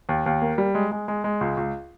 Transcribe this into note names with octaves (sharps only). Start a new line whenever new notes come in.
D#2
D#2
A#3
G3
G#3
G#3
G#3
G#3
C#2
C#2